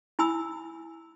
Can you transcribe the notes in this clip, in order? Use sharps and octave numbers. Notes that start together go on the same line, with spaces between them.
E4 G#5 B5 E6